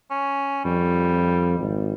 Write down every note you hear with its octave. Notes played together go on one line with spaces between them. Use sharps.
C#4
F2 G3
G#1